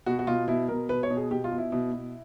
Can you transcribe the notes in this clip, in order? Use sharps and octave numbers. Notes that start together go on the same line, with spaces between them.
B2 F#4
F#4
B2 F4
B2 E4
B2 A#4
B2 B4
C#5
B2
G#4
B2 G4
F4
B2
E4
B2
B2